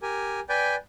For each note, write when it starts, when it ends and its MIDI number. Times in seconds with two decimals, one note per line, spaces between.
0.02 0.40 67
0.02 0.40 70
0.02 0.40 80
0.49 0.75 71
0.49 0.75 74
0.49 0.75 79
0.49 0.75 80